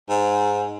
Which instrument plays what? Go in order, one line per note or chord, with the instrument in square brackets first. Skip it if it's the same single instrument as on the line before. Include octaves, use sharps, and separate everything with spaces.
[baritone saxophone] G#2